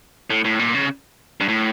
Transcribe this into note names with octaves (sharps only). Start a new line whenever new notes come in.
A2
A2
A#2
C#3
G2
A2